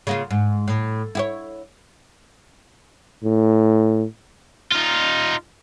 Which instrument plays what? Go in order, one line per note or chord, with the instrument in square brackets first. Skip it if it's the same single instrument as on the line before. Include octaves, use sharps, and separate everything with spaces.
[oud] C#3 A#3 F4
G#2
A2
E4 G4 C#5
[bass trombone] A2
[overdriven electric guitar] D#4 F4